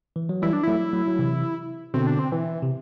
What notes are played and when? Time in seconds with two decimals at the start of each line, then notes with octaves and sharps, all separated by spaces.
0.16 E3
0.29 F#3
0.42 E3 G3 E4
0.53 D4
0.63 F#3 A3 E4
0.93 F#3 A3
1.08 F#3
1.19 C3 E3
1.94 B2 D3 C4
2.07 D4
2.19 C4
2.32 E3
2.62 C3